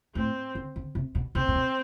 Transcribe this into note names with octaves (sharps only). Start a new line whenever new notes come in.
A2 C4
D3
D3
C3
B2
C3 C4
A2
B2